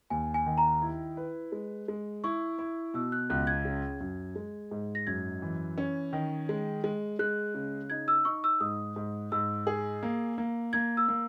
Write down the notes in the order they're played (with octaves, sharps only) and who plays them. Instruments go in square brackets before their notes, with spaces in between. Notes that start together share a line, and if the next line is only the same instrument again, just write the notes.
[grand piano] D#2 [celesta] G#5
[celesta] G#5
[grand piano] D#3
[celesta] A#5
[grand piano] E4
B4
G#3
G#3
[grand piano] E4 [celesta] C#6
[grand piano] E4
[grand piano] B2 [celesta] E6
[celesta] F#6
[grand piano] C#2 [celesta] F#6
[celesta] G#6
[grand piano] C#3
F#2
G#3
G#2
[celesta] A#6
[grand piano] F#2 [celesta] G#6
[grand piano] E3
C#4
D#3
G#3
G#3
[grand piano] G#3 [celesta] F#6
[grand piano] C#3
[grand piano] D#4 [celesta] G#6
[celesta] E6
[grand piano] D#4 [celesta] C#6
[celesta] E6
[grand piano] G#2 [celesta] D#6
[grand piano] G#2
[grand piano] G#2 [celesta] E6
[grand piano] G#4
A#3
A#3
[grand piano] A#3 [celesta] G#6
[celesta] E6
[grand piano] A#3